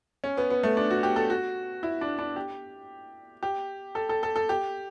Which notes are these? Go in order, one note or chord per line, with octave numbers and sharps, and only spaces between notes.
C#4
B3
B3
A3
D4
F#4
G4
A4
F#4
E4
D4
D4
G4
G4
A4
A4
A4
A4
G4